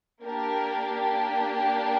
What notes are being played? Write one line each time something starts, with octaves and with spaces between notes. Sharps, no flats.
A#3 D4 G4 A#4